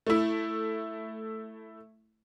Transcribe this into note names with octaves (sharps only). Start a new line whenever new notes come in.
A3 E4